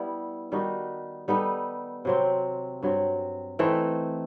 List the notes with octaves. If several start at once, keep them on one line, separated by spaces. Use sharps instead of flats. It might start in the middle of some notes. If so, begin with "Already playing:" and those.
Already playing: G3 B3 E4
D#3 G3 D#4 F#4
G3 B3 D#4 A4
C3 F#3 C4
G2 F#3 C4
E3 A3 C4 D#4